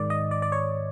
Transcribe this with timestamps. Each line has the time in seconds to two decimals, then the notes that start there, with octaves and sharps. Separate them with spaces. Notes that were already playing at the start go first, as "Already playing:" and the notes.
Already playing: G#2 D#3 D5
0.10 D#5
0.31 D5
0.42 D5
0.52 C#5